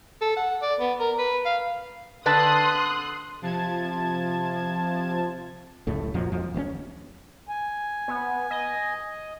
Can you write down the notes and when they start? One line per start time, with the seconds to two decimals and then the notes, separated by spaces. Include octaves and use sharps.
0.21 A4
0.37 F#5
0.62 D5
0.80 B3
1.00 A#4
1.19 B4
1.45 F5
2.26 D3 B4 A5 C6 D#6 F#6
3.41 C3 F3 A5 G#6
5.87 F1 C#2 A2 A3
6.14 F2 A#2 F3 F#3
6.32 F2 F3
6.54 D1 A1 A#3 C#4
7.49 G#5
8.08 B3
8.51 D#5